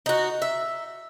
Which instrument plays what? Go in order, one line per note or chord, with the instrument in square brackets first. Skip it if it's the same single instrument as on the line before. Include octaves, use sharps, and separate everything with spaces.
[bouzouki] D#4 F#4
E5